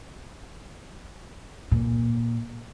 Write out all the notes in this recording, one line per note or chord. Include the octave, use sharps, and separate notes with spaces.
A#2